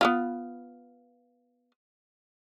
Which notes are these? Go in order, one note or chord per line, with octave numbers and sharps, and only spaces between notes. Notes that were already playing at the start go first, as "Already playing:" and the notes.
B3 E4 F4